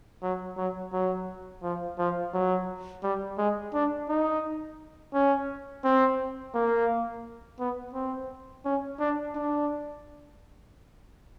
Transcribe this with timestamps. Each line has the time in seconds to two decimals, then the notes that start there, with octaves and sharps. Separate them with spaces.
0.23 F#3
0.57 F#3
0.93 F#3
1.63 F3
1.98 F3
2.33 F#3
3.03 G3
3.38 G#3
3.74 D4
4.09 D#4
5.14 C#4
5.84 C4
6.54 A#3
7.59 B3
7.94 C4
8.65 C#4
9.00 D4
9.35 D4